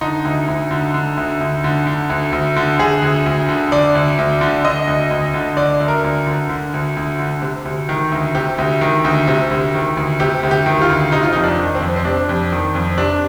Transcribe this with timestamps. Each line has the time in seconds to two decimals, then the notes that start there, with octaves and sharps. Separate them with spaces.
0.01 D3 D#4
0.25 D2
0.48 D2
0.71 D3
0.94 D3
1.17 D2
1.41 D2
1.64 D3
1.87 D3
2.10 D2
2.33 D2
2.56 D3
2.79 D3 G#4
3.02 D2
3.26 D2
3.49 D3
3.72 D3 D5
3.95 D2
4.18 D2
4.41 D3
4.64 D3 D#5
4.87 D2
5.11 D2
5.34 D3
5.57 D3 D5
5.80 D2
5.88 A#4
6.04 D2
6.26 D3
6.49 D3
6.74 D2
6.97 D2
7.19 D3
7.42 C3
7.65 D2
7.89 D#3
8.12 D2
8.35 C3 G4
8.58 D2
8.81 D#3
9.04 D2
9.28 C3
9.51 D2
9.74 D#3
9.97 D2
10.20 C3 G4
10.43 D2
10.51 G4
10.66 D#3
10.82 F4
10.90 D2
11.12 C3 D#4
11.23 F4
11.33 F2 D#4
11.43 D4
11.59 D#3
11.75 C4
11.82 F2
11.96 C4
12.05 C3 D4
12.29 F2
12.52 D#3
12.75 F2
12.97 C3 D4